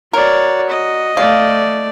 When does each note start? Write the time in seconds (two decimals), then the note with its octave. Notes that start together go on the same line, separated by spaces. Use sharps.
0.13 F#4 A#4 C#5 D5
0.70 D#5
1.17 A3 D5 F5